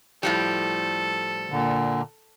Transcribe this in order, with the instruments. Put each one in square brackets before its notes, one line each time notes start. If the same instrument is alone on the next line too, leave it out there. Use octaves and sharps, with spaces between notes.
[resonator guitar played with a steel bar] A2 F3 G3 [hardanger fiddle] A4
[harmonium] A#2 D3